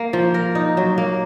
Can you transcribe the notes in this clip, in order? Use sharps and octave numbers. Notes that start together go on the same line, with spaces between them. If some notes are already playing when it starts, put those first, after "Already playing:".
Already playing: A#3
F3
A#4
D#4
F#3
A#3